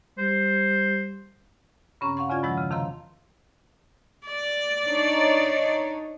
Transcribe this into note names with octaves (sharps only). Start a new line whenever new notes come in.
G3 C5
G2 C#3 C4 C#4 A#5 C#6
F5 F#5 C6 C#6
E2 C#3 C#4 F4 D5 G#6
G2 D#3 F3 G#3 F#5 E6
C#3
F2 C3 D#3 F5 A#5 C6
D5
D4 D#4 C#5